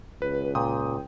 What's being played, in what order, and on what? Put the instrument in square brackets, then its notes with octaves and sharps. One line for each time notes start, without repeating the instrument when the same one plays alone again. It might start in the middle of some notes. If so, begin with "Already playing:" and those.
[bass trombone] C#2 [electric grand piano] B4
[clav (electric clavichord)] A#2 [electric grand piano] G5 D#6